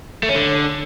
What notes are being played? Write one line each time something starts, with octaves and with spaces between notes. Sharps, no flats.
A3
C#4
D3